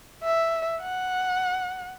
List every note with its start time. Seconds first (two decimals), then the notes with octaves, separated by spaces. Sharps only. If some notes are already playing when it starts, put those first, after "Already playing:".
0.23 E5
0.82 F#5